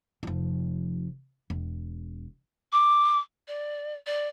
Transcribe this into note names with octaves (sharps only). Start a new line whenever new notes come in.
F1 F3
E1
D6
D5
D5